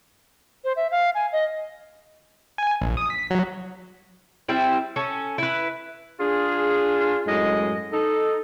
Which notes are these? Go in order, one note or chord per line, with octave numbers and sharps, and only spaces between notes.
C5
E5
F5
G#5
D#5
G#5
A#1
D#6
B6
F#3
G3 C4 E4
C#4 A4
E4 B4
D4 F4 G#4
F#2 A2 G#3 D#5
D#4 A4